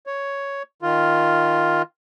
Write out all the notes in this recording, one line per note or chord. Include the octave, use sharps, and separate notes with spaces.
C#5
D#3 F4